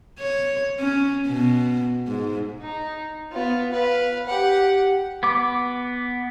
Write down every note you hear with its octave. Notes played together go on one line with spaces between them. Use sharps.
C#5
C#4
B2
G#2
D#4
B3 F4
B4 F5
G4 F#5
B3 D6